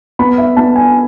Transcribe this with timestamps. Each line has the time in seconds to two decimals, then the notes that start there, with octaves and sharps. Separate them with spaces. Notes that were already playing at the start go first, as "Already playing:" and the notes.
0.19 B3 B5
0.38 E5
0.57 B3 A5
0.76 G#5